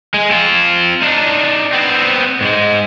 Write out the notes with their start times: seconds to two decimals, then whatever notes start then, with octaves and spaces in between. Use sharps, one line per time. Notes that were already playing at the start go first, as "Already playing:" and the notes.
0.14 G#3
0.31 C4 F4
1.02 D4 D#4
1.73 B3 C4
2.41 G#2 G#3